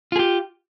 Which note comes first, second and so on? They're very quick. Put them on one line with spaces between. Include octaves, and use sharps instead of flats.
F4 G#4 G4